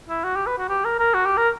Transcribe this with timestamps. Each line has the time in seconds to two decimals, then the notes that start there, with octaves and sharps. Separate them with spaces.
0.09 E4
0.24 F#4
0.35 G4
0.47 B4
0.58 F#4
0.69 G4
0.85 A#4
0.99 A#4
1.14 F#4
1.26 G4
1.37 A#4